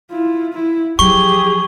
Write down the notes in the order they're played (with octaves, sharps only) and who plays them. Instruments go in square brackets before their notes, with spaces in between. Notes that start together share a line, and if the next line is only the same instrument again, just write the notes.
[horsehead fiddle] E4 F4
E4
[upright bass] F3 F#3 [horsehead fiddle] G4 G#4 [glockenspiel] C#6 G7